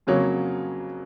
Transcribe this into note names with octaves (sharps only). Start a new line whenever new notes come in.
F2 C#3 F#3 A#3 C#5